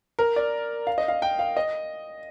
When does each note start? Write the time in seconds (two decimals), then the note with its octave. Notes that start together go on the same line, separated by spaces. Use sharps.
0.19 A#4
0.36 D5
0.87 F5
0.98 D#5
1.08 F5
1.22 G5
1.39 F5
1.57 D#5